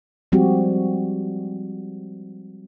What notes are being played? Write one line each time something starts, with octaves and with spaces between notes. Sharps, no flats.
F3 G3 G#3 C4 F#4 G4